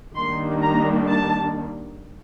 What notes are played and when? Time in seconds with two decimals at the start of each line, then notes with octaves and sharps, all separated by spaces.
0.16 D#3 G3 A#3 D4 C6
0.62 A#5
1.08 A5